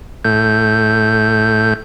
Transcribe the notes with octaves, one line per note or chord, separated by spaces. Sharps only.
A2 G6